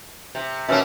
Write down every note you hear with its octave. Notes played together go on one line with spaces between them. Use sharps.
C3
B2 A#3 C#4 E5